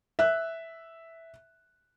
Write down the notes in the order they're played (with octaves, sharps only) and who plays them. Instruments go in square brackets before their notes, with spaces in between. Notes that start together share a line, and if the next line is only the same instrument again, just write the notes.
[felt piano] E5 F#6